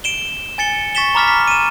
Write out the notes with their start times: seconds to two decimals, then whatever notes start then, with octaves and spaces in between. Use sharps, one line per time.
0.04 D7 E7 G7
0.58 G#5 A6 C#7 G7
0.95 C#6 A6 B6 E7 G7
1.15 A#5 B5 D6 F6 A6 B6
1.28 B6
1.47 D#7 E7